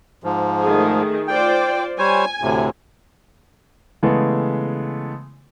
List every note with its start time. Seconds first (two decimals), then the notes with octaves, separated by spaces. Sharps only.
0.24 G#2 F3
0.61 D#3 A3 G#4
1.28 F4 C5 D5 G5
1.99 G3 C5 C#5 G#5
2.42 D2 A2 C3
4.03 C#3 E3 G#3 A3 B3